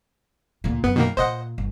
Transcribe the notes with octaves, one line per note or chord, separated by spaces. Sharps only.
D2 A#2
F#2 B3
B2 D#3 A#3
A#2 C5 D#5 F#5
G1